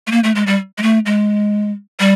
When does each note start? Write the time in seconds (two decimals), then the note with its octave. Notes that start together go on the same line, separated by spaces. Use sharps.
0.07 A3
0.12 A#3
0.24 A3
0.35 G#3
0.47 G3
0.78 G#3
0.82 A3
1.06 G#3
2.00 G3